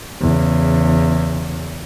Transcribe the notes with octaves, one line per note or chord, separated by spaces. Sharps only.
E2 C#3